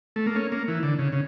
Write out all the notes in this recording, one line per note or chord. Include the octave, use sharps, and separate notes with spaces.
A3
A#3
C#4
A#3
E3
D3
C#3
C#3